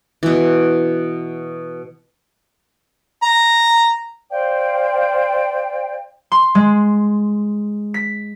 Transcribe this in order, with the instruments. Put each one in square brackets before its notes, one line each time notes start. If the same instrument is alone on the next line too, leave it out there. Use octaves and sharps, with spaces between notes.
[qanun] B2 E3
[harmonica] A#5
[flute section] C5 D5 F5 G5
[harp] C6
G#3
B6